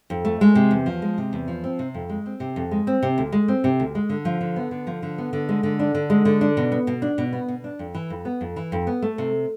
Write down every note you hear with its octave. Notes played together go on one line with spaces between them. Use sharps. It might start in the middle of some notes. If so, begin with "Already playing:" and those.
F2
A3
G#3
C3
E2
F3
G#3
C3
E2
F3
C4
C3
F2
G#3
C4
C3
F2
G#3
C4
C3
D2
G#3
C4
C3
D2
G#3
D3
F3
D3
B3
D3
F3
D3
B3
D3
G#3
D3
D4
D3
G#3
D3
D4
B2
B3
B2
D4
B2
B3
B2
D4
F2
E3
F2
B3
F2
E3
F2
B3
A3
C3